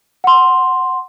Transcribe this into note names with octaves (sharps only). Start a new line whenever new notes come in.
F#5 C6